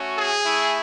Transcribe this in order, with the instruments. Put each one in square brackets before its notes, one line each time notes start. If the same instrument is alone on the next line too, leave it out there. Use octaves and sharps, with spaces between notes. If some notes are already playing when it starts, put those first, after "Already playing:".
Already playing: [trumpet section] A3 C#4 F#4
G#4
A3 E4